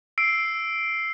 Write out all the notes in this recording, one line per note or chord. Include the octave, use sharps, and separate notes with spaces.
E6 C7 D7